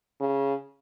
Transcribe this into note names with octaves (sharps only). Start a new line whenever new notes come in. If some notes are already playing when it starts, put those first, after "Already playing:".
C#3